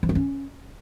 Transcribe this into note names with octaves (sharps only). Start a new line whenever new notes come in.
F3
A3
C#4